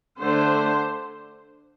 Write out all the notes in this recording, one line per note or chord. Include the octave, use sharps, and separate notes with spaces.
D3 A3 D4 C5